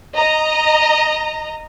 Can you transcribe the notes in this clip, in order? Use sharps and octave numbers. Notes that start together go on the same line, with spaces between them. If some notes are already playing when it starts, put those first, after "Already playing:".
D#5 A#5